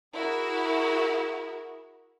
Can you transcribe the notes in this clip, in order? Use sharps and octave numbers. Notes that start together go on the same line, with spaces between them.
E4 F#4 G#4 A#4 E5